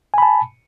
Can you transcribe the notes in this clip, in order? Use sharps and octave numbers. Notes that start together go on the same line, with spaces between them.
G#5 A5 B5